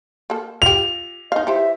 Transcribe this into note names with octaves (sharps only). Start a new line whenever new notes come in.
A#3 A4
F4 G4 F7
D#4 D#5 F5
E3 G4 C5 E5